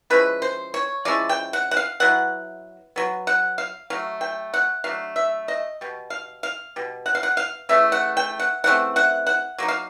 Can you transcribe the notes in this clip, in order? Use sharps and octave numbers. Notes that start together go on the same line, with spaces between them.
F3 G#3 C#4 E4 B4
C5
C#5
F3 G#3 C#4 E4 D5
G5
F#5
F#5
F5
F#3 B3 E4 F#5
F#3 B3
F#5
F5
F#3 A3 F5
G5
F#5
F#3 A3 D4 F5
E5
D#5
B2 G3
F5
F5
B2 G3
F#5
F5
F#5
F5
C#3 E3 A3 E5
F#5
G5
F#5
C#3 E3 A3 C4 F#5
F#5
F#5
F#3 A#3 D#4
F5